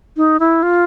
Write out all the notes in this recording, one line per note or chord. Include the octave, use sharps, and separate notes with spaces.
D#4
E4
F4